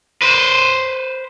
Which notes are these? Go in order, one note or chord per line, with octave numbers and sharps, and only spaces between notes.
B4 C5